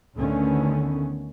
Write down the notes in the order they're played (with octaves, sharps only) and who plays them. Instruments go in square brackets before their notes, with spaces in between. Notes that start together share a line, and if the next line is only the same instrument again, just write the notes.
[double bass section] D2 D3 D#3 A3 B3 C#4